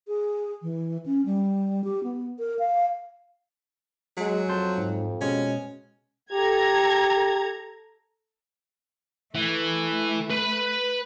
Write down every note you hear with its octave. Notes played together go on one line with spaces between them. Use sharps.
G#4
E3
C#4
G3
G4
B3
A#4
F5
F#3 G#3
F2 A5 C6 G6
G#2
B2 G#3 C#4
G4 A4 A#5 G#6
E3 A3
B4 B5